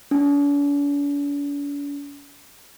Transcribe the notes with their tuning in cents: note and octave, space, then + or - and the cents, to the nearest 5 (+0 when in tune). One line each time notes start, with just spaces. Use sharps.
D4 -45